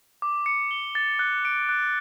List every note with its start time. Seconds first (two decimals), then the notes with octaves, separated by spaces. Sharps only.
0.22 D6
0.46 C#7
0.71 G7
0.95 A6
1.19 F#6
1.45 D7
1.69 F#6